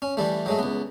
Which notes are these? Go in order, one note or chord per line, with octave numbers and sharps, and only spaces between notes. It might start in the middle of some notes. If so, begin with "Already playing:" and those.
C#4
E3 G3 A3
F#3 G#3 A3
C#2 B3